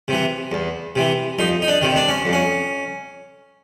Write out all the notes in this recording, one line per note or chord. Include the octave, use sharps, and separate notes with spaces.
C3 E3
E2
C3 E3
F2 D#4
D#4
D4
C3 D#3
D4
C#4
F2
C#4